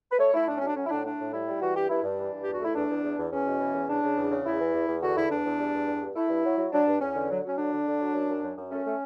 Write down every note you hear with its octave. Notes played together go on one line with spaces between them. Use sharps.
B4
A3 C#5
A3 E4
A2 D4
C#4
F#3 D4
F#3 C#4
E4
A2 D4
A3 D4
A2
G3 E4
G3
E3 F#4
G2 G4
G2 E4
G2 D4
E3
G2
E2 G4
F#4
A3 E4
E2 D4
E2
E2
E2
E2 C#4
B2
E3
E2
C#3 D4
C#3
E2
C#3
E2 E4
E3
E2
E2
D3 F#4
E2 E4
E2 D4
E2
G3
E2
G2
G2
A3 E4
G2
F#3
F#3
F#3 D4
G2
E2 C#4
D3
F#3
F#3 C#4
D3 D4
D3
D3
F#3
F#2
F#2
F#2
F#2
A3 C#4
A3